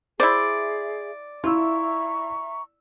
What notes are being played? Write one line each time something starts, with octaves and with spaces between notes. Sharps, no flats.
E4 G#4 C5 D5 E5
E4 F4 E5 A#5 C#6 E6